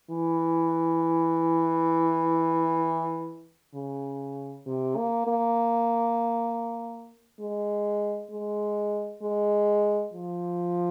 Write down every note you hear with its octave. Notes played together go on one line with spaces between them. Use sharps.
E3
C#3
C3
A#3
A#3
G#3
G#3
G#3
F3